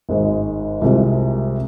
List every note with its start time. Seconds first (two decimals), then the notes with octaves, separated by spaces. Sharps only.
0.09 G#1 G#2 G#3
0.81 C2 C3 G#3 F4